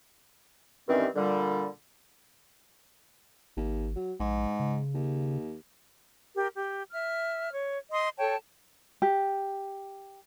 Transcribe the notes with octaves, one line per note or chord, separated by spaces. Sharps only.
G2 D#3 E3 G3 C4 C#4
A#2 D3 G3
G#1 D#2
F#3
A#1 G#2
C#3
D#2
G4 A#4
G4
E5 F6
C#5
D#5 C6 D#6
A4 C#5 G5 A5
G4